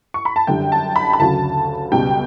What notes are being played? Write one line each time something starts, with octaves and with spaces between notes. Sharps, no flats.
C#6
B5
A5
F#2 D3 G3 G5
A5
B5
B5
D2 C#3 F#3 A5
C#2 B2 G3 G5